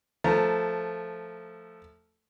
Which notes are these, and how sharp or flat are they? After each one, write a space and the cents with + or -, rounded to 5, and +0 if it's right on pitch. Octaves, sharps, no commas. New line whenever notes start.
F3 +0 A3 +5 A#5 -10